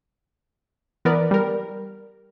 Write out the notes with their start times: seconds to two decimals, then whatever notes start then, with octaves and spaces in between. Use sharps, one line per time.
1.05 E3 B3 A#4 B4 D5
1.31 G3 A#4